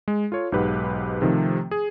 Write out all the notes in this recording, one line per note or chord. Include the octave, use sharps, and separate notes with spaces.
G#3
F4 A4 C#5
B1 G#2 G4 B4 F#5
C3 D#3 F3 A3
G#4